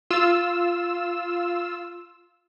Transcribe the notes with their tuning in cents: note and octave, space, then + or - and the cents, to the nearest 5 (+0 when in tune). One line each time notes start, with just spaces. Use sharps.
F4 +0 E6 +0